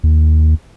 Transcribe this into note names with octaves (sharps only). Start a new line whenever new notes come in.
D#2